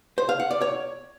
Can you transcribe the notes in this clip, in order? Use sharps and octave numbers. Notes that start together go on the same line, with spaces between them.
C5
F5
F#5
D5
C#5